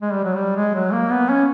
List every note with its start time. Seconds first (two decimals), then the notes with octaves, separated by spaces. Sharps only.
0.02 G#3
0.13 G3
0.24 F#3
0.35 G3
0.56 G#3
0.74 F#3
0.93 A#3
1.11 B3
1.30 C#4